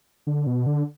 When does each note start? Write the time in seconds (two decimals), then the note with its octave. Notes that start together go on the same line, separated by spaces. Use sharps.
0.27 D3
0.47 B2
0.66 D3